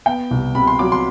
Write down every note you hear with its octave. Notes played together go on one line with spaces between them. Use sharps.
B3 G5
C2
C3 B5
C6
F#3 D6
C6